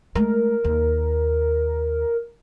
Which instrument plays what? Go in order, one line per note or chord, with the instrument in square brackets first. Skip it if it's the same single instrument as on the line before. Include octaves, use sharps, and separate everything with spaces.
[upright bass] G#3 A3 [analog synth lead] A#4
[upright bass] D#2